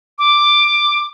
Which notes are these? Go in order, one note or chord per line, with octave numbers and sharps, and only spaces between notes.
D6